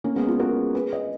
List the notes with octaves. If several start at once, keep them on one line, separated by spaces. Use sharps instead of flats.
A#3 C#4
G#3 B3
F4 G#4
F#4 A#4
G#4 B4
B4 D#5